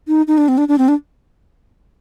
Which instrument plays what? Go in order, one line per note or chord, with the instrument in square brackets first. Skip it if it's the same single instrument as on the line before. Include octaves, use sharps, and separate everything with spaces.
[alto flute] D#4
D#4
D4
C4
D4
D4
C4
D4